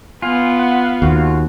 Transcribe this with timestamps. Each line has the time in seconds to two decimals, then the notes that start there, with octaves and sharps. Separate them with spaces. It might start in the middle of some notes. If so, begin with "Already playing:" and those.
0.22 B3 F4 G#5
0.58 F#5
1.02 D#2 F#4